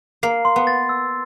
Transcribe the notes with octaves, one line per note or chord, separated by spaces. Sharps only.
A#3 C7
C6
B3
A6
E6